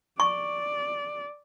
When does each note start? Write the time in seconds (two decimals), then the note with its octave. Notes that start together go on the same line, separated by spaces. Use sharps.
0.20 D5 C#6